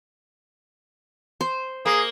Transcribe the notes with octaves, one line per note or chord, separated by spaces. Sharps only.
C5
A#3 G#4